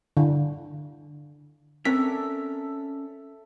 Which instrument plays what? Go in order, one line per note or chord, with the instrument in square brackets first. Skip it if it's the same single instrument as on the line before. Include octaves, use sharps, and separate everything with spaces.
[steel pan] D3
[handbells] C4 B6 [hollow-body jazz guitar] C#4 A#4 D5 [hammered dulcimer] A4 E5